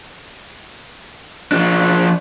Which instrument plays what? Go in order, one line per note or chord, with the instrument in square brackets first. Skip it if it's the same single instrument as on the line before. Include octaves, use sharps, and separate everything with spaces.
[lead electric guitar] F3 D4